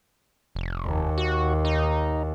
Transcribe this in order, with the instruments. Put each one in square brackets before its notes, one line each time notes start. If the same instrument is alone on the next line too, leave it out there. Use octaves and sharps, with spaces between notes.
[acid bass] F1
[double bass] D#2
[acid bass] F#4
D#4